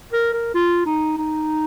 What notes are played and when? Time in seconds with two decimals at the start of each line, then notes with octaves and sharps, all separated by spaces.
0.13 A#4
0.33 A#4
0.55 F4
0.86 D#4
1.18 D#4